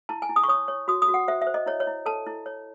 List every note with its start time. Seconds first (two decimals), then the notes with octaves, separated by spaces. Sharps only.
0.09 E4 A5
0.22 G#5
0.29 E4
0.36 D#6
0.44 C#6
0.48 C#5 D#6
0.68 C#5
0.88 F#4 D#6
1.02 D#6
1.08 F#4
1.14 F#5
1.28 C5 E5
1.42 E5
1.47 C5
1.54 D#5
1.66 E4 C#5
1.80 C#5
1.87 E4
2.06 A4 A5
2.27 E4
2.46 C#5